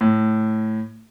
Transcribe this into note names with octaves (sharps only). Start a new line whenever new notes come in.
A2